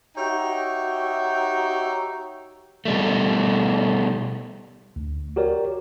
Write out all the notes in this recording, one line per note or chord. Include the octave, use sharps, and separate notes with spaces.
D#4 F#4 G4 C#5 E5 G5
B2 G3 A3
D2
F#4 G4 A#4 C#5 D5